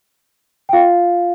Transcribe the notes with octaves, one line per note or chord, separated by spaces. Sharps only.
G5
F4 F5